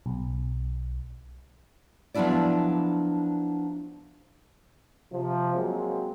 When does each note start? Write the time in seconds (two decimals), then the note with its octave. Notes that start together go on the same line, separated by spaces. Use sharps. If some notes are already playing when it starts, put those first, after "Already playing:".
0.06 B1
2.14 F3 F#3 B3 D4 E4 D5
5.12 C3 F3
5.55 F#3 G#3 A#3 C4